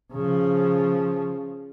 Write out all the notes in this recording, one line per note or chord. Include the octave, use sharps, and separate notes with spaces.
C#3 F3